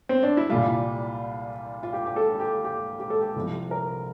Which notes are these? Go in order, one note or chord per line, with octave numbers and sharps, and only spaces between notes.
C4
D4
E4
C2 A#2 G3 F4
F4
G4
G4
A4
G4
G4
G4
A4
G4
C2 C3 F3
A#4